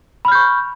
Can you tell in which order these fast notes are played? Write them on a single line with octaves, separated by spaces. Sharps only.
B5 F6 G6 C#6